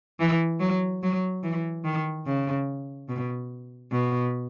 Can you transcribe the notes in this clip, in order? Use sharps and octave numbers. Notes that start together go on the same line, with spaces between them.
E3
F#3
F#3
E3
D#3
C#3
B2
B2